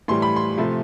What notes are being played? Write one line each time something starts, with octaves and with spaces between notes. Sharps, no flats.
A2 E3 G3 C6
B5
C6
C3 F3 A3